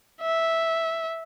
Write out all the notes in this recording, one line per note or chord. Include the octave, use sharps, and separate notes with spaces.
E5